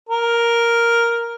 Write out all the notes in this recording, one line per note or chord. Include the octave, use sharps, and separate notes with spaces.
A#4